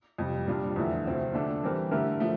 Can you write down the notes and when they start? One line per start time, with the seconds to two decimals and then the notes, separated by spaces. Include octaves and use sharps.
0.18 F2 C3 G3
0.47 A#2 G3 D4 F4
0.76 E2 D3 F3 A3 E4
1.06 D2 C3 F3 C4 E4
1.33 D3 A3 D4 A4
1.63 E3 G3 C4 G4 A#4
1.91 D3 A3 E4 G4 A#4
2.20 F3 A3